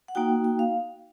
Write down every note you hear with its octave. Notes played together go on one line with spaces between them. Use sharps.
F#5
A#3 D#4 F#4 G5
G5
F5